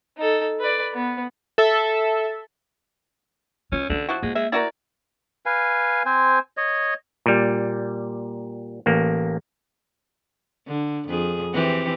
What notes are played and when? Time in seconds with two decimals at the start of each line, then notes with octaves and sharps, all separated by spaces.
0.17 D#4 A4
0.60 B4 D5
0.93 B3
1.58 A4 E5
3.72 C#4 F4
3.90 D3 C#4 D4
4.09 F3 E4 F#4
4.23 G#3 A#3
4.35 G#3 E5
4.52 E4 F#4 A#4 D5
5.46 B4 F5 G#5
6.06 C4 C5 G#5
6.57 C#5 D#5
7.26 A#2 G3
8.86 A1 A#3
10.68 D3
11.08 F2 G#4
11.53 E3 C4 G4